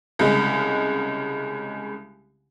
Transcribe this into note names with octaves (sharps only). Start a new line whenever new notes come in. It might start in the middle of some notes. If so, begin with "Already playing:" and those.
C2 C#3 G#3